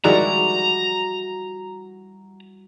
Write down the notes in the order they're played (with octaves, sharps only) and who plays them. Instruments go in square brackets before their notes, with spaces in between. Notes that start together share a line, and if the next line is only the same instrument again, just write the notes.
[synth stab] D#3 G#3 D5 [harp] G3 E4 F#4 [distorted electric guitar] A#5